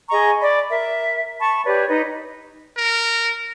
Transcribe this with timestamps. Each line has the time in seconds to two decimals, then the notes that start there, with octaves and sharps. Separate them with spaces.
0.10 G#4 D#5 A#5 C#6
0.40 D5 B5
0.69 A#4 E5
1.39 A5 B5 C#6
1.64 G4 B4 C#5 D5
1.88 D#4 B4 D#5
2.78 A#4